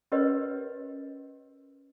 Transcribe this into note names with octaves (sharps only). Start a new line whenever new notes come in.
C#4 G4 A#4 B4 C#5 D#5